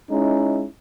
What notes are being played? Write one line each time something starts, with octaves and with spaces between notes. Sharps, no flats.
G#3 C#4 D#4 E4